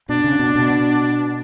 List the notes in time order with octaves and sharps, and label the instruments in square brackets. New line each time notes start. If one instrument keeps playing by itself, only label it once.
[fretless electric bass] B2 [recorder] D4
[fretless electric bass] C#3
B2
B2